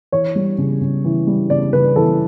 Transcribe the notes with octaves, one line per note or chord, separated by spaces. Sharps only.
E3 C#5
G3
C#3
C#3
E3
G3
C#3 D5
C#3 B4
E3 A4